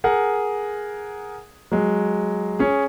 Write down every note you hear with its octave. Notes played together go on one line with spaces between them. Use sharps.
G#4 A#4 F#5
F#3 G#3
C#4 G#4